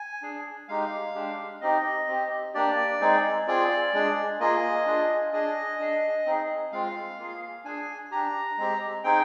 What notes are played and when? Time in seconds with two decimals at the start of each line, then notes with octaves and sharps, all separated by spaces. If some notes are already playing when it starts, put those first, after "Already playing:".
Already playing: G#5
0.22 D4 G#4
0.68 G#3 D#4 G4 F5
1.15 G#3 D4 G4
1.61 C4 D#4 G4 D#5
2.08 C4 G4
2.54 A#3 D4 G4 D5
3.01 G#3 C4 D#4 G#4
3.47 C4 F4 G#4 D5
3.94 G#3 D4 G#4
4.40 A#3 F4 G#4 D#5
4.86 D4 F4 G#4
5.33 D4 G#4 D#5
5.80 D4 G#4
6.26 C4 D#4 G#4
6.72 G#3 C4 F4 F5
7.18 A#3 F4 G#4
7.64 D4 G#4 G#5
8.11 D4 G4 A#5
8.58 G#3 C4 G4
9.04 C4 D#4 G#4 G5